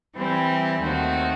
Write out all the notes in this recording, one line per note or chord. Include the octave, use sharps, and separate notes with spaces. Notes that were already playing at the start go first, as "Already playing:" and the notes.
E3 G3 C4 E4 G4
D#2 D#3 A3 C4 F#4